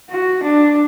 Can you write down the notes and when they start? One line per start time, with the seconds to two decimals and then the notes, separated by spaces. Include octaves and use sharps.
0.10 F#4
0.43 D4